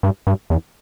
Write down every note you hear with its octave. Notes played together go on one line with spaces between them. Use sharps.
G2
G2
E2